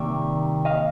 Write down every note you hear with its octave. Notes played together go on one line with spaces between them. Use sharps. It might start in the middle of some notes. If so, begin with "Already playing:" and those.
Already playing: C3 D#3 G3 A#3 D5 E5
D#5 F5